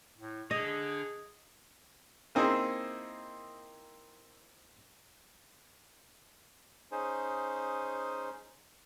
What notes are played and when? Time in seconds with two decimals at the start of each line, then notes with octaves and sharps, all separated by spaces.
0.18 A2
0.51 D3 G#4 D#5
2.35 A#3 C4 D#4 E4 G#4 C5
6.91 C#4 D#4 G#4 C5